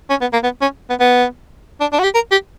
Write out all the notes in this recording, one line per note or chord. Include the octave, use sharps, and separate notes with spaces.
C#4
B3
A#3
B3
C#4
B3
B3
D4
D4
F#4
G4
A#4
G4